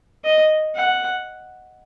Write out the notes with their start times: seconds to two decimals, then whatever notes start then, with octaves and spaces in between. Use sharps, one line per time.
0.24 D#5
0.75 F#5